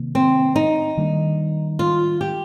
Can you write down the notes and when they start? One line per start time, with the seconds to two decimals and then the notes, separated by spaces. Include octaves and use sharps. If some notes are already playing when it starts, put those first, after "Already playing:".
Already playing: C3 D#3 A#3
0.15 C4
0.56 D#4
0.97 D#3 G3 A#3 D4
1.79 F4
2.21 G4